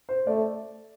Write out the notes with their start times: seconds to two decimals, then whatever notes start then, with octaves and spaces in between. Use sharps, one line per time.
0.09 C5
0.27 A3 D5